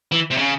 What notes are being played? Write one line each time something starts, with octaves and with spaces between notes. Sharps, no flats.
E3
C3
C#3